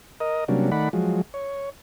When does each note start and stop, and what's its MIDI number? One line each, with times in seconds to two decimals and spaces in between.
0.20 0.44 70
0.20 0.44 75
0.48 0.70 48
0.48 0.70 54
0.48 0.70 55
0.48 0.70 58
0.48 0.70 61
0.48 0.70 62
0.72 0.89 51
0.72 0.89 57
0.72 0.89 74
0.72 0.89 78
0.72 0.89 83
0.93 1.21 53
0.93 1.21 54
0.93 1.21 56
1.34 1.70 73